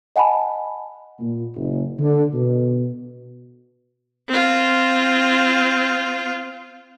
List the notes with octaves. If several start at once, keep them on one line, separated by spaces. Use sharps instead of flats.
D#5 F#5 G#5 A5 B5
A#2
F#1
D3
B2
C4 F4